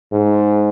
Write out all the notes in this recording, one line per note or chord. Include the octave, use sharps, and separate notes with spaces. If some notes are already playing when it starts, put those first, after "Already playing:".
G#2